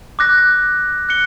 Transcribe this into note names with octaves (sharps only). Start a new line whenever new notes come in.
D6 F#6 A#6
F#6 C#7 G7